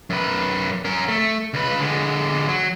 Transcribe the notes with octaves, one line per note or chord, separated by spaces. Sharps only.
F#2 B4
C#4 A#4
A3
C#2 B4
D3 G#3
F#3